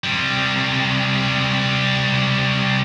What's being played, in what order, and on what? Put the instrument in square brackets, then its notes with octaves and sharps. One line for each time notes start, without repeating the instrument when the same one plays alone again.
[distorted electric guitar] C3 G3